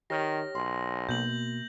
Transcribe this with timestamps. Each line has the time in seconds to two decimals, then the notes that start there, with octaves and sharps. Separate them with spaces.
0.10 D#3 G4 C#5 F6 A#6
0.55 B1 C6
1.09 B2 A#3 G6 F#7